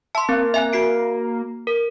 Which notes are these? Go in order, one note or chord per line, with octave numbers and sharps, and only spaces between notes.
E5 A5 C6
A#3 C4
E5 G#5 F#6
F#4 C7 D7
A#4